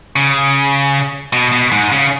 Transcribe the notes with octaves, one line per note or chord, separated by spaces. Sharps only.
C#3
B2
B2
G#2
C#3